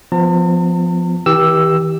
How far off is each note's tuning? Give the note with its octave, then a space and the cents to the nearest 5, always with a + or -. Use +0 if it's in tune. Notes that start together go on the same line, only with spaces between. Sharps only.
F3 +0 B3 +25 A5 +45
E3 -45 G4 +0 E6 +5